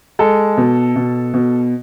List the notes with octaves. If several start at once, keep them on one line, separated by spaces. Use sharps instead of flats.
G#3 A4
B2
B2
B2